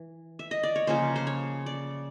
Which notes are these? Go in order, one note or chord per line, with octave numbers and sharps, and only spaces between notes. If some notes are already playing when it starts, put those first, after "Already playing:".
Already playing: E3
E5
D#5
D5
C#5
C#3 F3 A#3 C#4 C5
C5
C#5
D5